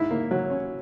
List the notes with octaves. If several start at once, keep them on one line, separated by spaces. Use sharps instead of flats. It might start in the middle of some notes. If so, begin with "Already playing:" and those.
Already playing: G#2 E4
A#3
F#3
C#4